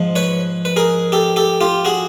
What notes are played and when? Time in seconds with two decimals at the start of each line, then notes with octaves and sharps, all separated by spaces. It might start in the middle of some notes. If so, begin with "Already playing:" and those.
Already playing: G#2 F3
0.16 B4 C#5
0.65 B4
0.76 G#4 A#4
1.12 G4 A4
1.36 G4 A4
1.61 F4 G4
1.85 F#4 G#4